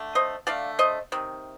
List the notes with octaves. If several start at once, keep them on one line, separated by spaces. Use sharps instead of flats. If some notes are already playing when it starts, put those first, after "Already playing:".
Already playing: D3 A3
C5 D#5
D3 A3 D5 F5
C5 D#5
C3 D#3